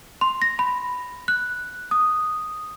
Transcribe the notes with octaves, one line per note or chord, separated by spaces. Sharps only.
C6
A#6
B5
F#6
D#6